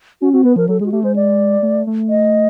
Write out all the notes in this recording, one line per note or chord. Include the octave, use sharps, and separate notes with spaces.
C#4 F#4
C4 F#4
B3 B4
F3 A#4
F#3 A4
G#3 G#4
F#4
A3 G4
G#3 C5
D5
A3
A3
D#5